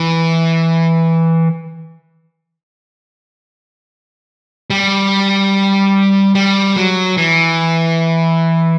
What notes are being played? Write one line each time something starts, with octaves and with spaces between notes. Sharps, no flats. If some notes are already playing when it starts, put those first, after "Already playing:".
Already playing: E3
G3
G3
F#3
E3